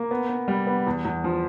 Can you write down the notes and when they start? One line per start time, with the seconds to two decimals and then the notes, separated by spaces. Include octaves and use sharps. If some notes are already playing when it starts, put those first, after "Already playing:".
Already playing: A#3
0.11 B3
0.29 B3
0.48 G3
0.67 B3
0.87 E2
1.05 E2
1.24 F3